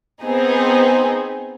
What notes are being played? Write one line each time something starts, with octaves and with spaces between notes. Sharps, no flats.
B3 C4 D#4 G#4